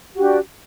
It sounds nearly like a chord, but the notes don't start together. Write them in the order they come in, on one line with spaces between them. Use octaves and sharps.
F#4 G4 D4